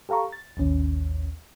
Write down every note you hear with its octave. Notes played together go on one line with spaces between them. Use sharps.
G4 A4 F5 A#5 C#6
A6
A1 D#2 C#4